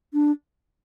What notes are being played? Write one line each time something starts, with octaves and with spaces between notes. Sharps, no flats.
D4